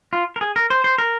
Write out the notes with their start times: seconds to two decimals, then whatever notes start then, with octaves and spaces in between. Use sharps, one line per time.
0.13 F4
0.36 A#4
0.41 G#4
0.56 A#4
0.70 C5
0.84 C5
0.98 A#4